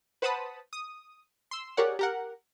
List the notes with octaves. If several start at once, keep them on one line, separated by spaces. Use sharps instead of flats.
B4 C5 F#5 A5 B5 D#6
D#6
C6 E6
G4 G#4 A#4 C#5 D5 F#5
G4 A#4 F#5